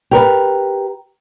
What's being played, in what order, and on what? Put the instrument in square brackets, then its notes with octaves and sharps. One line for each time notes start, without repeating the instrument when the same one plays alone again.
[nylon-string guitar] G4 A#4 B4